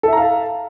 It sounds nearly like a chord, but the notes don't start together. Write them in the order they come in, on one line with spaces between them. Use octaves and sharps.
A4 E5 A#5 F5 A5